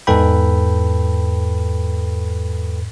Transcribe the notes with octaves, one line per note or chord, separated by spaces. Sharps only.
E2 G#2 A4 B4 G5 B5